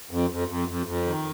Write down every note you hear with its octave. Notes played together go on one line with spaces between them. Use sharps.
F2
F2
F2
F2
F2
D#3